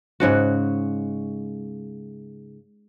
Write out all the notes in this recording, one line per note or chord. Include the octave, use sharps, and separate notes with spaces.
G#2 C#3 F#4